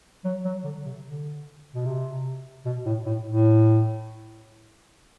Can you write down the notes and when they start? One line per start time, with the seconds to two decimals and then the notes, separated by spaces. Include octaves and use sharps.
0.24 F#3
0.45 F#3
0.64 D3
0.85 C3
1.04 D3
1.74 B2
1.85 C3
2.65 B2
2.85 A2
3.06 A2
3.26 A2